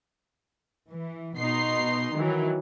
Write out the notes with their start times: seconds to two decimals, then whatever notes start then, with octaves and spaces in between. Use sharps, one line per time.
0.91 E3
1.39 B2 D#4 C6 C7
2.17 D#3 E3 F#3